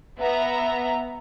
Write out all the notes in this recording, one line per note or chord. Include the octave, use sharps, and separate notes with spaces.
B3 E5 A#5